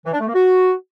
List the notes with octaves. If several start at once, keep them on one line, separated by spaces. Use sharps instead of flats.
E3
D4
A3
A#3
F#4